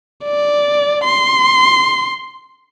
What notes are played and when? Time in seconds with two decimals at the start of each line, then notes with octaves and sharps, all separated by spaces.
0.24 D5
1.04 C6